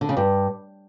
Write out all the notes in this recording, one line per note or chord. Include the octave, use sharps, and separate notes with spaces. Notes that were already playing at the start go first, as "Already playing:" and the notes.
D3
C#3
G2